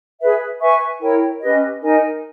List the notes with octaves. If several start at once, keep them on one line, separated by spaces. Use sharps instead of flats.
G#4 B4 E5
B4 E5 G#5 C#6
E4 A#4 C#5 G5
C#4 G4 B4 D#5
D#4 A#4 D#5 G#5